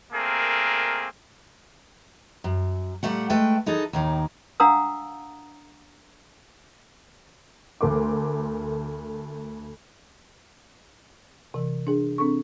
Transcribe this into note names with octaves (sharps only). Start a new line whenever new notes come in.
A3 A#3 C4 G#4 A#4
F#2
A#2 F3 G3 A3 F#5
G#3 A3 B4 G5
E3 D#4 G#4 A4
D#2 A2 D#3
D4 F5 F#5 A#5 D#6 E6
D2 A3 A#4 C6 D6
C3 E3
D4 G#4
C4 D4 A4 C#6